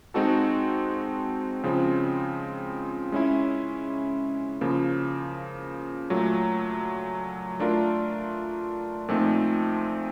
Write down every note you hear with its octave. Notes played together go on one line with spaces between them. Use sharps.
G#3 C4 D#4 F#4 A4
C#3 F3 G#3 C4
G#3 C#4 E4
C#3 F3 A#3
A#2 F#3 A3
A3 D4 F4 A#4
A#2 F3 A3 C4 D#4